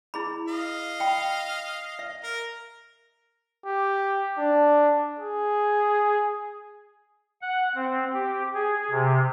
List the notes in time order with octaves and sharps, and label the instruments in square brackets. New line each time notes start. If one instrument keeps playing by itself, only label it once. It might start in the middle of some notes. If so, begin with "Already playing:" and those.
[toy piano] E4 G#4 B5
[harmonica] D#5 F5
[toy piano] G5 B5
E5
[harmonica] A#4
[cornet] G4
D4
G#4
[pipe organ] F#5
C4
G4
G#4
C3